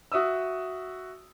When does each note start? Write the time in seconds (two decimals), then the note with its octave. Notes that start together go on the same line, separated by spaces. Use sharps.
0.12 F#4 E5 D#6 E6